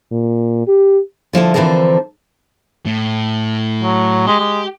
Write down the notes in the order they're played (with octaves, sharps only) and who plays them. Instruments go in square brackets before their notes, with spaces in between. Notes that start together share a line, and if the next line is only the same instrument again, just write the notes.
[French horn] A#2
G4
[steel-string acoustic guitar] D3 F3 E4 A4
D3 E3 F3 C4 A4 A#4
[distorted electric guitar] A2
[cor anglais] F#3
[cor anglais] G#3 [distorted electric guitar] G4
[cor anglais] G#3